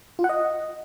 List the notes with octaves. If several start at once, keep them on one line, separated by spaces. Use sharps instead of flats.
F4
F#5
D#5